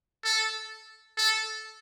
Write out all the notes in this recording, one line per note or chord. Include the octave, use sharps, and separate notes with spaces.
A4
A4